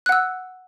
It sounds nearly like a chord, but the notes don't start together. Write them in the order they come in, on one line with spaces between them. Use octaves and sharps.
F#6 F#5 E6